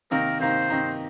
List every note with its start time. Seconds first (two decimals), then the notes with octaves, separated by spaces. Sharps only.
0.11 C3 D#3 A#3 D#4 A#4
0.40 C3 D#3 A#3 D#4 C5
0.70 C3 D#3 A#3 D#4